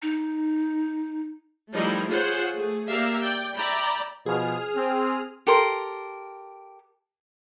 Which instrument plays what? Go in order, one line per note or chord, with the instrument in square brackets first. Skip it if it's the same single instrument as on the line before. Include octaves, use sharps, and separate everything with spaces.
[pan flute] D#4
[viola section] F3 G3 A3 D#4 E4 A#4
F4 G#4 C5 C#5 F#5
A3 G#4
A#3 G4 A#4 D5 E5 F5
D5 G5
D5 E5 G5 A#5 B5
[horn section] B2 F3 [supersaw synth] G#4 F6
[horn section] C4
[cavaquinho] G4 A4 A#4 C6